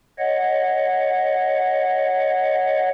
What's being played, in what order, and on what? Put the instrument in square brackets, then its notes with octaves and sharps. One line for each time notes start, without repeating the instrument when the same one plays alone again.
[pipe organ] C#5 D#5 F#5